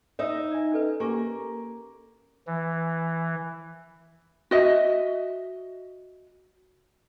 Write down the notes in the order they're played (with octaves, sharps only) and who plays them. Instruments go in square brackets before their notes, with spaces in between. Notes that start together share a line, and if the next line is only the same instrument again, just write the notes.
[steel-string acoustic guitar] D#4 D#5 E5
[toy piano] D5 G#5
C#4 A4 B4
[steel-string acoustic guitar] A#3 [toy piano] C#4 G4 G#5
[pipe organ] E3
[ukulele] F#4 D#5 E5